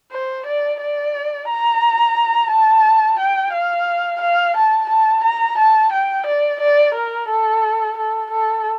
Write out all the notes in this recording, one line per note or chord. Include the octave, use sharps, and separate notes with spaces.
C5
D5
D5
A#5
A5
G5
F5
F5
A5
A5
A#5
A5
G5
D5
D5
A#4
A4
A4
A4